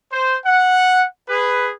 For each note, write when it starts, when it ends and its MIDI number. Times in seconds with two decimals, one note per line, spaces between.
0.11 0.36 72
0.45 1.04 78
1.27 1.71 68
1.27 1.71 71